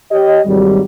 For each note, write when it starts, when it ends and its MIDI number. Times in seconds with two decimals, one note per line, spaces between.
0.12 0.39 67
0.12 0.39 73
0.12 0.39 75
0.46 0.79 32
0.46 0.79 39
0.46 0.79 54
0.46 0.79 55